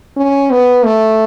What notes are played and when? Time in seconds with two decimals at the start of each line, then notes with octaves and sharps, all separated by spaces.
0.17 C#4
0.51 B3
0.85 A3